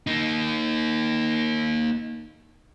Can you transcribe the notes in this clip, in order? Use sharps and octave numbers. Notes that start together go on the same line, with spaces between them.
A#3 D#4